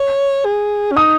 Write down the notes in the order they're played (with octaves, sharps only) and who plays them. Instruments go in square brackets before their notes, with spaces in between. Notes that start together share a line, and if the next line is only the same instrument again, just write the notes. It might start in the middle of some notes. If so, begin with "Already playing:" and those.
Already playing: [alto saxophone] C#5
G#4
C#4
[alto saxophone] D#4 [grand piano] D#6